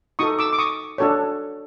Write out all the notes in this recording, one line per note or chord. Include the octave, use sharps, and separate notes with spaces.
D#4 F#4 A4 C#6 D#6
D6 E6
D6
C#6 D#6
D4 F#4 A4 C#5